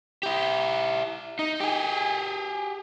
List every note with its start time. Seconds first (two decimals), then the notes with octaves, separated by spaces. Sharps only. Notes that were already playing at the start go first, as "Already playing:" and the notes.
0.23 E4 G4
1.39 D#4
1.60 G4 G#4